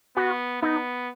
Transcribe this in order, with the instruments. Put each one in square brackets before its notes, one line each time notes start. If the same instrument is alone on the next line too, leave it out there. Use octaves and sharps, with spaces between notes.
[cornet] B3 [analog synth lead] F#4
[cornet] B3 [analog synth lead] D#4